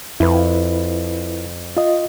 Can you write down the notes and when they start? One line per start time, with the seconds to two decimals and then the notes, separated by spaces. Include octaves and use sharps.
0.20 F2 E4 B4
1.77 F4 D#5